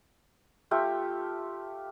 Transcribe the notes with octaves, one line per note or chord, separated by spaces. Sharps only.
A3 F4 G4 E5